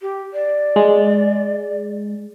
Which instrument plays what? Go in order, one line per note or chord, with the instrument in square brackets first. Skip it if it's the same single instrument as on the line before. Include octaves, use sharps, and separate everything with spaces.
[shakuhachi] G4
D5
[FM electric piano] G#3